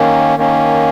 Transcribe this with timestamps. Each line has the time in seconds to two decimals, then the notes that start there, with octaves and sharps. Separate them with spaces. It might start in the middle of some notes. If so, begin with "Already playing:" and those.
Already playing: D#3 A#3 C#4
0.37 D#3 A#3 C#4